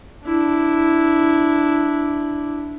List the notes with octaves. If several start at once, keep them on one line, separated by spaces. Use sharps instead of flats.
D4 E4